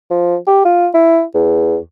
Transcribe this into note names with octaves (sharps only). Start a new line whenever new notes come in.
F3
G4
F4
E4
E2